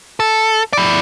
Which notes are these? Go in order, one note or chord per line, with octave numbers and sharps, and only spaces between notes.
A4
E4 D5